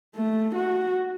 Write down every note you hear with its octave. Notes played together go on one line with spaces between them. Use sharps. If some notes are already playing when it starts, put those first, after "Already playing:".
A3
F#4